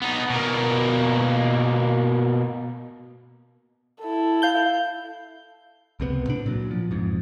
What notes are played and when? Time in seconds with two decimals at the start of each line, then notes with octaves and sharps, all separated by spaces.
0.02 B3 D#4
0.30 B2 A#3
4.02 E4 A4
4.42 F5 G6 G7
6.00 C#2 C3 A3 B3
6.27 A2 D4
6.46 A#2 F#3
6.71 F3
6.90 E1 F2 G#2